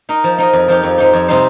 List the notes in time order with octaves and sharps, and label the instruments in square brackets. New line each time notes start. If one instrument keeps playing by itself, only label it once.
[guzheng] D#4 A#4 D#5
F3
D#4 A#4 D#5
F2
F3 D#4 G4
F2
F3 D#4 G4
F2
C3 G3 D#4 C5